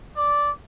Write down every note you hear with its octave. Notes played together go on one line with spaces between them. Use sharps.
D5